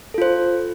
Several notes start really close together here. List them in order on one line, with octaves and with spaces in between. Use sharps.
A4 F4 C5